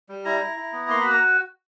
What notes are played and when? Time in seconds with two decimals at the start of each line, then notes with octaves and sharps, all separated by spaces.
0.09 G3
0.25 E4 A#5
0.41 E4
0.57 E4
0.73 B3
0.88 A#3 C6
1.01 F#4 B5
1.10 A#5